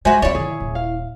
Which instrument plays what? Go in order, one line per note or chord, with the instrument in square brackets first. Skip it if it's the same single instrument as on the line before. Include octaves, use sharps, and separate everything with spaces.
[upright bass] G3 [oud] G#3 F#4 [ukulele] C5 E5 G#5
[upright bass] G#3 C4 [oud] E4 C#5 [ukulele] D5
[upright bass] C3 D#3 [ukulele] G#4
[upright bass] D#1
[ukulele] F5